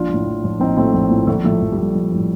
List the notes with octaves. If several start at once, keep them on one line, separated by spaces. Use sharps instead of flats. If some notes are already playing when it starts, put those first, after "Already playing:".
Already playing: A#1 D4 F4
A2 F3
A#1
A2 F3
A#1 C4 D#4
A2 F3 A3 C4
A#1
A2 F3
A#1 A3
A2 F3 A3
A#1
G3
A2 F3 A3
A#1
A2 F3